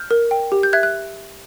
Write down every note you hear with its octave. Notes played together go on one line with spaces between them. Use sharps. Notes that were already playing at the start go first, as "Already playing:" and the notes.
Already playing: F6 G6
A#4
G5
G4
G6
E5 F#6 G#6
F#6